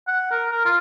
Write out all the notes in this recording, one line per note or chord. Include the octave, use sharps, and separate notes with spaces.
F#5
A#4
A#4
F4